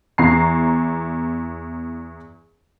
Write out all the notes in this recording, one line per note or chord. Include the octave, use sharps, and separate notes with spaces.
E2 A#5 C7